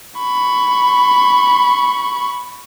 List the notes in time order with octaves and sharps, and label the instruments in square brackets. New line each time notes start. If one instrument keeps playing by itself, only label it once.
[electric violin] B5 C#6